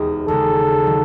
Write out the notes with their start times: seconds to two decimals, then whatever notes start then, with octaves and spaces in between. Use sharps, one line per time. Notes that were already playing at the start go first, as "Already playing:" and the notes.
Already playing: E1 D#2 D#3 G#3 B3
0.28 D#2 C#3 G#3 A4
0.86 D#3 F#3